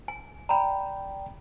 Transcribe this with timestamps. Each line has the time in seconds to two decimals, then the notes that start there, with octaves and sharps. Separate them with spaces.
0.08 G#5
0.49 D5 G5 A#5 B5